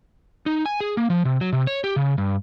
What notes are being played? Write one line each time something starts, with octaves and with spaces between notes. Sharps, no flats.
D#4
G#5
G#4
A#3
F3
C3
F#3
C3
C#5
G4
C#3
G2